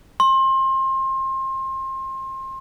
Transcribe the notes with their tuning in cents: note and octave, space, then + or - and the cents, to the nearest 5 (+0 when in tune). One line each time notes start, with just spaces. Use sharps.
C6 +30